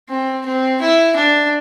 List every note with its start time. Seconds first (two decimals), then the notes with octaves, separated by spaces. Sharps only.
0.09 C4
0.45 C4
0.81 E4
1.16 D4